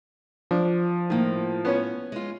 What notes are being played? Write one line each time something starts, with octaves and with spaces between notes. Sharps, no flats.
F3 D4
A2 D#3 A#3
B3 C#4 C#5
G#3 F4